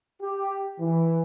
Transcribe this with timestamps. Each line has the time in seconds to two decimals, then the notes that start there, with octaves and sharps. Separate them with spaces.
0.22 G4
0.81 E3